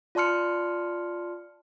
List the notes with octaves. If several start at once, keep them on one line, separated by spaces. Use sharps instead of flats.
F4 D5 A5 C6 F6 C#7